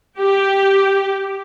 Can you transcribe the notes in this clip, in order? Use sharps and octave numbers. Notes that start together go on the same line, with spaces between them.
G4